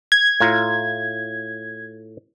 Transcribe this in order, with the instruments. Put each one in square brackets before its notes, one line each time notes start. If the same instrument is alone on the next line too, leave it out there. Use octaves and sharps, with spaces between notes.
[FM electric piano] G#6
[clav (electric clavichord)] A2 F4 A#5